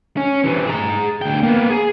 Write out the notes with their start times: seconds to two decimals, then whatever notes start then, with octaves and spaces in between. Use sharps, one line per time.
0.17 C#4
0.44 C3 E3
0.67 G#4 A#5
1.21 D2 G5
1.43 A#3 B3
1.70 G#4